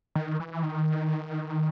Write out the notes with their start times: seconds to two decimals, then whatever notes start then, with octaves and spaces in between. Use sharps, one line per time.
0.15 D#3
0.40 E3
0.63 D#3